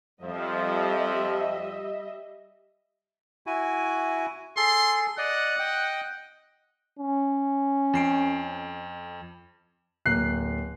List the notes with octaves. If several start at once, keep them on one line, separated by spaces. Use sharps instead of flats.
F2 F3 G3 D#5 E5
E4 F#4 G#5
G#4 A4 C6
D5 D#5 F#5
D#5 G5
C#4
F2 C7 D7
D1 A#3 F#6 C7